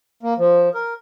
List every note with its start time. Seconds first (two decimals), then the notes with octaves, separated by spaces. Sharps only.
0.23 A#3
0.38 F3
0.74 A#4